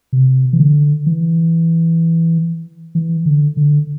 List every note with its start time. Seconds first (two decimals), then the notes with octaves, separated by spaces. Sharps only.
0.13 C3
0.53 E3
0.60 D3
1.06 E3
2.95 E3
3.26 D3
3.57 D3